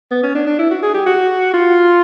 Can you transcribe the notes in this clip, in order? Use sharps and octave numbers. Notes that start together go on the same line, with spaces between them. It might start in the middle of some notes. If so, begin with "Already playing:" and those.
B3
C#4
D4
D4
E4
F#4
G#4
G4
F#4
F4